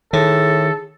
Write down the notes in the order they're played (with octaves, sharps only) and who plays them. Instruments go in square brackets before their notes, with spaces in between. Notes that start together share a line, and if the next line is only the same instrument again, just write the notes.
[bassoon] A2 [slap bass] D#3 [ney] G#4 [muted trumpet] A4